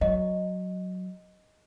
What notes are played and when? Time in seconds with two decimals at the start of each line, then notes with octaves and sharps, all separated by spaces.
0.01 F#3 D#5